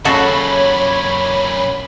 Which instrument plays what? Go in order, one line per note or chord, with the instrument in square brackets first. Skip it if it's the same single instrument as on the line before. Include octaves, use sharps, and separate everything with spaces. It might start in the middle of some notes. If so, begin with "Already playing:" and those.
[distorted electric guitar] F#2 A#2 [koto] C#3 F#4 A4 [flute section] C#5 [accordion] B5